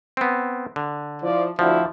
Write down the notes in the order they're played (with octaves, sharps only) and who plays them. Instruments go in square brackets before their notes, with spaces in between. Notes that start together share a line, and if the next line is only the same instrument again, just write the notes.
[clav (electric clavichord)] B3 C4
D3
[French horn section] F3 E4 [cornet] D5
[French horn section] D2 F#4 D5 [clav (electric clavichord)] F3 [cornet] E4